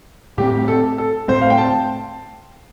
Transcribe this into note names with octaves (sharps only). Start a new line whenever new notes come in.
A2 A3 C4 G4
A4
A4
A2 A3 C4 C5
F5
G5
A5